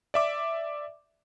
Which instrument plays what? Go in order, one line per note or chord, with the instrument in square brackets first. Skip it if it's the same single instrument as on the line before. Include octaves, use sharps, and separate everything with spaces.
[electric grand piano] D5 E5 D6